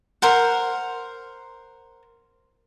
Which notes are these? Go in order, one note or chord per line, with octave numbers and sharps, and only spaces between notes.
A#4 C5 F#5